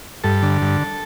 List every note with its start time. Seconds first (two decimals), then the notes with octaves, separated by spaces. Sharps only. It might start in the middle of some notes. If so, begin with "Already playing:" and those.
0.24 G2 A4
0.43 D3
0.62 G2